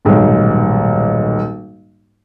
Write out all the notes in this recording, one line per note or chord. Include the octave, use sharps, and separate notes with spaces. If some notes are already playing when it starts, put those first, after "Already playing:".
D#1 B1 G#2